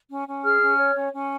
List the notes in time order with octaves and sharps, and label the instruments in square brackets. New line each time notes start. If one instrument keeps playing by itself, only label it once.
[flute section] C#4
C#4
G#4 F6
C#4
C#5
C#4
C#4